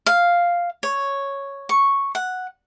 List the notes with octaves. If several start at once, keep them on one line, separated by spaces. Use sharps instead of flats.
F5
C#5
C#6
F#5